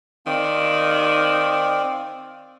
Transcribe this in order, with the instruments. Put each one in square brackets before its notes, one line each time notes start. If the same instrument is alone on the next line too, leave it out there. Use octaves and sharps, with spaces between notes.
[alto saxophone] D#3 [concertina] C4 D5 F5